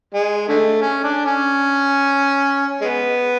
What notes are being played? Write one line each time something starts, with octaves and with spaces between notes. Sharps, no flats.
G#3
D3 A3
C#4
D4
C#4
G#3 B3